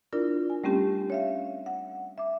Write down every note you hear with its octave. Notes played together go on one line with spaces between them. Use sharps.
D4 E4 F4 A#4 D5
G#5
G3 A3 C4 C#4 G4
C#5 E5 F5
F#5
E5 D6